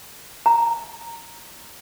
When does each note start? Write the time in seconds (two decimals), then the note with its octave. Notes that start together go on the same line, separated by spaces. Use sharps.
0.46 A#5